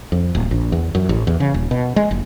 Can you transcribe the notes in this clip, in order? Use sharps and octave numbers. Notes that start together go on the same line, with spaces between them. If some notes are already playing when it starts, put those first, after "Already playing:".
F2
D1
A#1
E2
F#2
A1
E2
C#3
D#1
B2
G#3
F#1